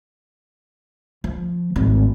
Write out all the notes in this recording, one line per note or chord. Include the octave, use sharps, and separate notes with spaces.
F3
G#1 A2